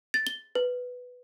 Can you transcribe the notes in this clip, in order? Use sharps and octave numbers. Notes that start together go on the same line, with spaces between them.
A6
G7
B4